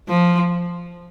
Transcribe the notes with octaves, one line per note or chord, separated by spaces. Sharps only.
F3